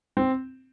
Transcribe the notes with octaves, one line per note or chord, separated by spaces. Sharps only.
C4